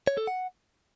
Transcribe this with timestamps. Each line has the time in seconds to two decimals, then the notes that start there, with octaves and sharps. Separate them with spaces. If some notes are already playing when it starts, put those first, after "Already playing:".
0.07 C#5
0.17 A4
0.27 F#5